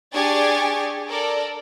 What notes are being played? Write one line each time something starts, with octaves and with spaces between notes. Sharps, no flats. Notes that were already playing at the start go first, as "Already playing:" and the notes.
D4 G4 G#4 G#5 C#6 A6
A4 A#4 D5